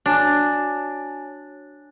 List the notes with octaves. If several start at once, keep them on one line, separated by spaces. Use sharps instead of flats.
D4 F#4 C#5 G#5